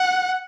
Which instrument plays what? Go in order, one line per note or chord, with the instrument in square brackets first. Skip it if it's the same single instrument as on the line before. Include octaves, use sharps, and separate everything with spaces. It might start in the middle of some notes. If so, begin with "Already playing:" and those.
Already playing: [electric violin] F#5